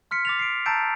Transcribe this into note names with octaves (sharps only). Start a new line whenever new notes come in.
C6 F6 B6 C#7
D6 A6 F7
C7 D7
A5 A#5 E6 G6 A6 D7